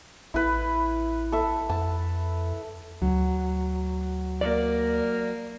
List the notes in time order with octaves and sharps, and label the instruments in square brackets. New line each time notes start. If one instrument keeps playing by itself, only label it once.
[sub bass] A1 [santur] E4 B4
[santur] A4 E5
[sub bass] F2 [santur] A5
[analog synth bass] D2 [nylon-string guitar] F#3
[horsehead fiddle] A#3 [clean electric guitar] D5